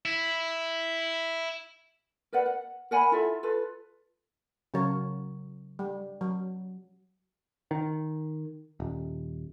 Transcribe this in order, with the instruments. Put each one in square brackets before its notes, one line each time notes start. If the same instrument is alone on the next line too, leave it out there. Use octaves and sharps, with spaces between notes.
[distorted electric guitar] E4
[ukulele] A#4 B4 D5 F#5
F#5
A#4 F#5 G#5 B5
E4 F4 A4 E5
F4 A4 B4
[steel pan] C#3 F#3 A#4 C#5
G3
F#3
[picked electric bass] D#3
D#1